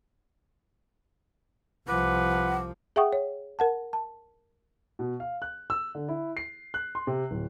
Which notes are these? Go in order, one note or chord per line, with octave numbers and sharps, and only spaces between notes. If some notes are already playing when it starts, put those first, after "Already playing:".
C2 F3 B4 F#5 D6
G#4 E5 F#5 G5 C#6 D#6
C#5
A#4 F#5 A5
A5
B2
F5
F#6
E6
D3
E4
C7
F#6
C6
C3
D1